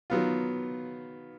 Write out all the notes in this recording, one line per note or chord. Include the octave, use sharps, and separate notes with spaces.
D#3 F#3 B3 F4